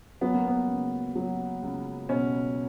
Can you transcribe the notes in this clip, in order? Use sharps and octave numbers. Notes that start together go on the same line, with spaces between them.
F#3 B3
A#3
B3
C#2
F#3
C#2
B2 C#4